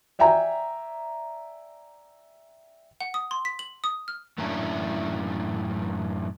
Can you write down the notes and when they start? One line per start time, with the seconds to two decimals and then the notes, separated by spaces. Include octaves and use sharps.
0.19 D5 E5 G5 G#5 A#5
3.01 F#5
3.14 D#6
3.31 C6
3.45 B6
3.59 F#7
3.84 D#6
4.08 F6
4.38 F#2 A2 A#3 C#4 D4 E4